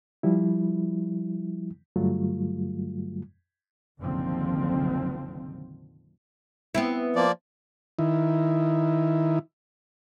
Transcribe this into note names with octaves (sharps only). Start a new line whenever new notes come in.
F3 G3 E4
G2 D3 F#3 G3 A3 F4
F#1 B1 D3 D#3 F3 C4
B3 C4 E4
F3 A#3 D5
D#3 E4